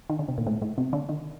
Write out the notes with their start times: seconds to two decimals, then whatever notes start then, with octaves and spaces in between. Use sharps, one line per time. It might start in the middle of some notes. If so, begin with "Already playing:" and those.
0.10 D#3
0.19 D3
0.29 C3
0.38 A#2
0.47 A2
0.62 A2
0.78 C3
0.93 D3
1.09 D#3